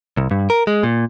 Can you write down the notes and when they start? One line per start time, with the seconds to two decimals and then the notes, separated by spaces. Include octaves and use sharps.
0.17 C2
0.31 G2
0.50 A#4
0.67 G#3
0.83 A#2